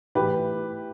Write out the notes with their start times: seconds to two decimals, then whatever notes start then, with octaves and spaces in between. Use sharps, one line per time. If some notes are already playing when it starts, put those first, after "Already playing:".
0.15 A2 E3 G4 B4